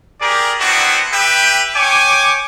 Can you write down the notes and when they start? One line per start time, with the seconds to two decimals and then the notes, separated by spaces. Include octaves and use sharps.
0.20 G4 G#4 A#4 D5
0.60 B3 C4 D4 E4 F#4
1.12 G4 B4 E5 G5
1.74 C#5 G5 G#5 D6